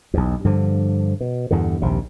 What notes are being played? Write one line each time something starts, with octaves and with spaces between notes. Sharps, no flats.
B1 E2
G2 D3 F3
B2
E2 G2 D3
A#1 D#2 C3